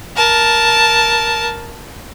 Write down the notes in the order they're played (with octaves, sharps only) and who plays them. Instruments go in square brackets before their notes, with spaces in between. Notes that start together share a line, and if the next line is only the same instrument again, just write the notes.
[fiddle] A#4 A5